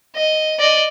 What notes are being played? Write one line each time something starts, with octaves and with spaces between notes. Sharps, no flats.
D#5
D5 D#5